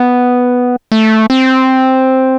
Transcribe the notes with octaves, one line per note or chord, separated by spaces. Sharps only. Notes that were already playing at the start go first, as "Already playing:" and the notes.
Already playing: B3
A3
C4